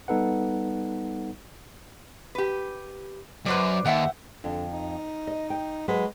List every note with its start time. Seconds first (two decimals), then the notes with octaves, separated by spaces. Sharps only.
0.08 G3 B3 D#4 A4 B4 F#5
2.35 G4 B4
3.46 F#2 B4 C5 D5
3.85 D#2 E5 F#5 G5
4.44 F2 D3
4.72 D#4
5.27 D#5
5.50 G5
5.88 F#3 G#3 B4